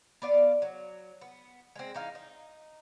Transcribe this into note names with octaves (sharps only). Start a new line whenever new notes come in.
B3 D5 F5
F#3
B3
G#3 C4
E3 D#4 F5
D#4